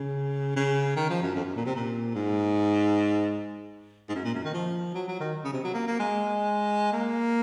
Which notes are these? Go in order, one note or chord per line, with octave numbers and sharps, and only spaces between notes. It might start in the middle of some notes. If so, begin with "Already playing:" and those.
Already playing: C#3
C#3
D#3
F3
F#2
F2
F#2
A#2
C3
A#2
G#2
G#2
F#2
A#2
F#2
D#3
F3
F#3
F#3
D#3
C#3
C3
F#3
A#3
A#3
G#3
A#3